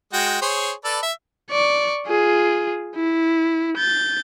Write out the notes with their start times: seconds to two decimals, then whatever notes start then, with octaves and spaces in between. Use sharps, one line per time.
0.13 G#3 F#4 G5
0.41 G#4 C5 C#5
0.84 A4 B4 D5
1.02 E5
1.51 D5 C#6
2.07 F4 G#4
2.95 E4
3.77 G6 A6